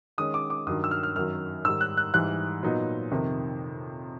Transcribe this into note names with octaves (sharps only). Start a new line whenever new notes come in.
D#3 G#3 C#4 D#6
D6
D6
G2 D#3 F#3 D#6
E6
F6
F6
F#2 D#3 F#3 F6
G#2 D#3 G3 E6
F#6
F#6
G#2 E3 G3 F#6
A#2 F#3 B3 D#4
F2 C3 D#3